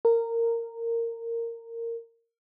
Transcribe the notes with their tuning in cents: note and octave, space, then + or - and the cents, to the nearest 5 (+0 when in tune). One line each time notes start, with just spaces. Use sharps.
A#4 -15